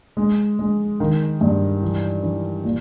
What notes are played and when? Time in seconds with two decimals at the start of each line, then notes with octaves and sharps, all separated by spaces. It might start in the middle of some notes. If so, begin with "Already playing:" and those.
0.17 G#3
0.59 G#3
1.00 D#3
1.41 G2
1.82 E3
2.23 E3
2.64 A#2